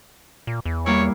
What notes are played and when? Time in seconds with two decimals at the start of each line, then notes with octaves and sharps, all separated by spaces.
0.47 A#2
0.65 E2
0.86 G3 A#3 E4 C#5